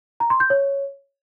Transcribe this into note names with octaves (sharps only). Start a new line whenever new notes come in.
A#5
C6
G6
C#5